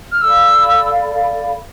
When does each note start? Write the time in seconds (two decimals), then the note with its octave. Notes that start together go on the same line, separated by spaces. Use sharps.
0.12 F6
0.22 A4 D5 F5 B5 E6